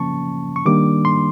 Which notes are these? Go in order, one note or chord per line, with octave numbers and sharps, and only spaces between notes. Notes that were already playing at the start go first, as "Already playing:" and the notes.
Already playing: C#3 F3 A#3 C#4 A5 C#6
C#6
D#3 G3 A#3 D4 D6
C6